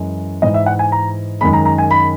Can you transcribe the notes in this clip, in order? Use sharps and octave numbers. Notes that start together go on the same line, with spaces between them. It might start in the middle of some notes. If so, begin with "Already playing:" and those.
Already playing: F#2 E3 G#3
G#2 E3 G#3 D#5
E5
F#5
G#5
A#5
F#2 D#3 G#3 B5
A#5
A#5
G#5
B5